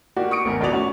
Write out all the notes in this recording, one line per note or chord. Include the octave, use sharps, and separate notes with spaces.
A#3 F#4 G4 D5
C#6 D#6 C#7 D7
G#1 A3 B3 A#4 G#5
A#1 A3 B3 F#4 D5 F7
C#4 F#4 C#6